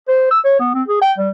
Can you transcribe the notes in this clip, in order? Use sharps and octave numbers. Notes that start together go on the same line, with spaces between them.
C5
E6
C#5
B3
C4
G#4
G5
G3